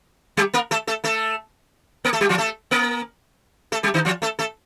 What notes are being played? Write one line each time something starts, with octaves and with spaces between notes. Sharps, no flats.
G3 G4
A#3 A#4
A3 A4
A3 A4
A3 A4
A#3 A#4
A3 A4
G3 G4
F3 F4
A3 A4
A#3 A#4
A3 A4
G3 G4
D#3 D#4
F3 F4
A3 A4
A3 A4